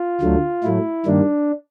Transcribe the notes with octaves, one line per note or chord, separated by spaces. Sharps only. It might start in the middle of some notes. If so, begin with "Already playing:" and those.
Already playing: F4
D2 D3 F#3 A3
A2 F#3 A3 E4
G2 D#3 G3 A#3 D4